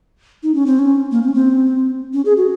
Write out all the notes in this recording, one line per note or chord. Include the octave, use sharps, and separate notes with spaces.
D#4
C#4
C4
C#4
A#3
C4
C#4
C4
C#4
G#4
F#4